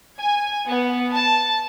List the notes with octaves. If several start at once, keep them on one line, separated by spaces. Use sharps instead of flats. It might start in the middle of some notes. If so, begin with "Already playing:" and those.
G#5
B3
A5